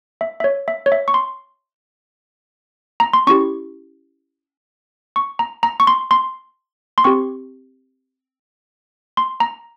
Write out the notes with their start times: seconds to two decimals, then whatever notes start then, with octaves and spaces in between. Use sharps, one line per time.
0.21 E5
0.40 E5
0.44 C#5
0.68 E5
0.86 C#5
0.92 E5
1.08 C#6
1.14 C6
3.00 A#5
3.13 C6
3.27 C#4 E4 G4 C#6
5.16 C#6
5.39 A#5
5.63 A#5
5.80 C#6
5.87 C6
6.11 C6
6.98 C6
7.04 C4 G4 C#6
9.17 C6
9.40 A#5